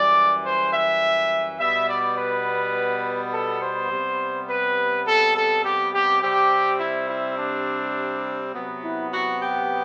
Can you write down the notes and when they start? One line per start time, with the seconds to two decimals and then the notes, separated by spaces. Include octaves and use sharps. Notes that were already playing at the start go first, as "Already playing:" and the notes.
Already playing: F#2 E3 G3 D5
0.45 C5
0.73 E5
1.59 B2 G3 B3 E5
1.89 D5
2.17 B4
3.33 A4
3.62 C5
3.91 C3 G3 B3
4.49 B4
5.06 A4
5.35 A4
5.64 G4
5.93 G4
6.22 C3 G3 C4 G4
6.80 E4
7.09 E4
7.38 D4
8.53 C3 F#3 B3
8.82 E4
9.11 F#4
9.40 G4